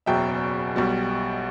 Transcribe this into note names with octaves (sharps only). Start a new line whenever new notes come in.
F#1 E2 B2 F#3 E5 G5
B1 B2 G3